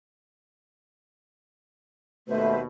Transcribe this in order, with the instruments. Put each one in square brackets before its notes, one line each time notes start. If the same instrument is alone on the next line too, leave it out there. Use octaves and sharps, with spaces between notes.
[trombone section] D#2 B2 [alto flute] A3 [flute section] B4 C5 E5